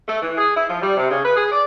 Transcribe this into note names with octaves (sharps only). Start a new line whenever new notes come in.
A3
E3
G#4
E4
F3
G3
C3
C#3
B4
G#4
D5